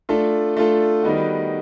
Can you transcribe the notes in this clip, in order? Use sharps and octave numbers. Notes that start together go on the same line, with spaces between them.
A3 D4 F4 A4
A3 D4 F4 A4
D#3 G3 B3 D#4 F#4